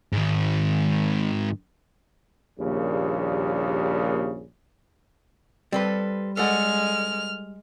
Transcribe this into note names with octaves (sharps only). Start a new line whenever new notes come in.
G#2 D#3
A#1 D#2 C#3 G3
G3 C4 A4 B4
G#3 A4 D5 F#5 F6